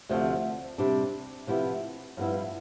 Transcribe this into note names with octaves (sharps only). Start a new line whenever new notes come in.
D2 C3 F3 A3
C3 G3 D4
C3 F3 B3 E4 G4
G2 F3 B3 E4